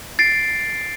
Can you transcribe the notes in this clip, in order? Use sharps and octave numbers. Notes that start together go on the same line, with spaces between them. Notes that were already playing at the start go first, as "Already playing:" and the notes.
A6 C7 D7